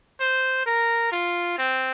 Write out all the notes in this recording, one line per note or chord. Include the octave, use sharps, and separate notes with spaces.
C5
A#4
F4
C4